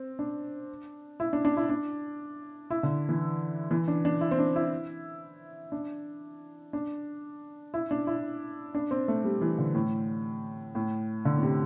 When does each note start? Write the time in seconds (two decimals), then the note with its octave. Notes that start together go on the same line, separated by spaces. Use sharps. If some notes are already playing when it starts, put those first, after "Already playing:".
Already playing: C4
0.19 D4
1.20 E4
1.33 D4
1.45 D4
1.57 E4
1.69 D4
2.70 E4
2.83 D3
3.09 E3
3.71 E3
3.88 D4
4.05 D4
4.21 E4
4.31 C4
4.39 D4
4.56 E4
5.72 D4
6.73 D4
7.74 E4
7.91 D4
8.07 E4
8.74 D4
8.91 C4
9.08 A3
9.25 G3
9.41 E3
9.58 D3
9.75 A2
10.75 A2
11.25 D3
11.37 A2
11.43 C3